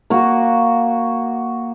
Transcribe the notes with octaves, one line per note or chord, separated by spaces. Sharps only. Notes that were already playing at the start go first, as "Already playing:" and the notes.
A#3 F#4